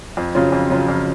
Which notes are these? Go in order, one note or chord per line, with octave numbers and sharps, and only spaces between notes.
F2
C#3 F#3 C#4 F4
F2
C#3 F#3 C#4 F4
F2